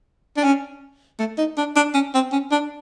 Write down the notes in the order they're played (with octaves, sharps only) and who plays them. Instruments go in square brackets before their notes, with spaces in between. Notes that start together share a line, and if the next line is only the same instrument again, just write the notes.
[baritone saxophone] D4
C#4
A3
D#4
D4
D4
C#4
C4
C#4
D4